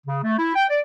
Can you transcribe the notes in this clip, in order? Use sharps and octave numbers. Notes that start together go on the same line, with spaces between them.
C#3
A3
E4
G5
D5